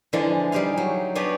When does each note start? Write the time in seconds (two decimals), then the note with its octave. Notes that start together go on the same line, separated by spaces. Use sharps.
0.13 D3 E3 F3 G#3 D4 E4
0.52 G3 D#4 G4 G#4 F5
0.78 F#3
1.15 B3 D4 G4 G#4 B4 C#5